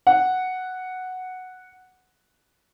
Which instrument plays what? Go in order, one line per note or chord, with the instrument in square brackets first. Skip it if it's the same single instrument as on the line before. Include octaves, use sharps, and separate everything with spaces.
[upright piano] F#5